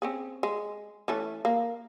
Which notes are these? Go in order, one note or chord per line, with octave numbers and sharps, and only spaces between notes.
C4 C#4 G#4
G#3
E3 A3 C#4
A#3